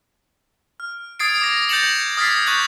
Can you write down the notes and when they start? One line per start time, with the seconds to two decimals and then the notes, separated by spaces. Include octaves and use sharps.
0.80 F6
1.19 D#6 G#6 A6 C7 D7
1.42 D6 A#6
1.69 G6 A6 A#6 C#7 E7 F#7
2.17 D#6 F6 G#6 A6 B6 C7
2.47 C#6 F#6 G6 A6 F#7